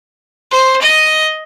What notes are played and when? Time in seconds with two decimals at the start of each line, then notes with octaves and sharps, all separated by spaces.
0.51 C5
0.81 D#5